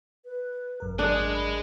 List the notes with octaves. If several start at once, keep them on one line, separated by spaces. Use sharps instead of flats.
B4
G#1 F#2 A#4
D4 G#4 D#5 A5
B5